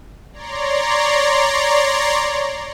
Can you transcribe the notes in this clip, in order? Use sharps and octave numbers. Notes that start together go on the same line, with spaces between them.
C#5 D5 A#5 C6